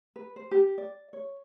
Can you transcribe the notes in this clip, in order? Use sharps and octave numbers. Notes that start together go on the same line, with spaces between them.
B4
C5
G4
D5
C#5